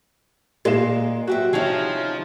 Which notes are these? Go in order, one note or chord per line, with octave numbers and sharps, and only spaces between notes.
A#2 G#3 D#5 F5 E7
F#3 F#4 G4 E5
C3 F3 C#4 D#4 E4 G#4